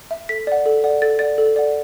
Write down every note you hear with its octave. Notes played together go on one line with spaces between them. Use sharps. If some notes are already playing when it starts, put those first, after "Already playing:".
E5
A4 B6
D5 F#5
A4
D5 F#5
A4 A6
D5 F#5 A6
A4
D5 F#5